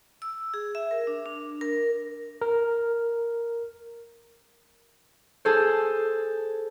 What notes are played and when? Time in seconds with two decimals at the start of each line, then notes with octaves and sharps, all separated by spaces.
0.22 E6
0.54 G#4
0.75 E5
0.91 A#4
1.07 D4
1.26 D4
1.61 A#4
2.41 A#4
5.45 G#4 A4 C5